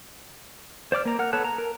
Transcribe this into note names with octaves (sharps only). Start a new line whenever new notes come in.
C5 D5 D6 F6
A#3 A#5
A#4 F#5 F6
B3 A4 C#5 A5 F#6
A#5
A#4